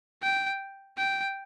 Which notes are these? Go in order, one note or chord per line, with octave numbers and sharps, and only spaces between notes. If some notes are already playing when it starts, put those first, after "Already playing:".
G5
G5